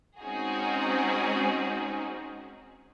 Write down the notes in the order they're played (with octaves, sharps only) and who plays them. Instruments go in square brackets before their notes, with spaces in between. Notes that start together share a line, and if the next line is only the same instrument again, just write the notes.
[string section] G#3 C4 C#4 D#4 F#4 G#4